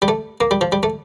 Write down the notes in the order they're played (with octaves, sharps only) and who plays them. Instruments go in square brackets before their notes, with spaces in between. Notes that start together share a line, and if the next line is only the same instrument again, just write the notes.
[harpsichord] G3
A3
A#3
G3
F3
G3
A3